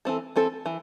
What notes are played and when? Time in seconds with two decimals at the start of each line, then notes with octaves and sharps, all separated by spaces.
0.05 E3 C4 A4
0.36 E3 C4 A4
0.66 E3